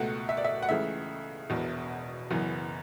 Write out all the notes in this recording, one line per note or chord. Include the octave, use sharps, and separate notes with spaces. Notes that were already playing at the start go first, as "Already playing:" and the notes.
Already playing: C#2 B2 A3 F#5
E5
D5
E5
F#5
C#2 C#3 E3 A3 E5
E1 E2 B2
F#1 F#2 E3 B3